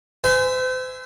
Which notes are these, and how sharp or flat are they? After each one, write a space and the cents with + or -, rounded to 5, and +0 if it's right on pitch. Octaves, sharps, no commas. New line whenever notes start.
C5 -40 E5 +0 G#5 +0